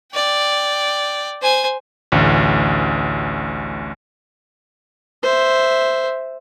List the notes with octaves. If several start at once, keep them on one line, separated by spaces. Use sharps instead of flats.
D5 G5
C5 G#5
A1 D2
C5 E5